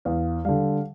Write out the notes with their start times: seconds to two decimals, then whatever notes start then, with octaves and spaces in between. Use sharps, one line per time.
0.05 E2 F5
0.45 D3 G3 F5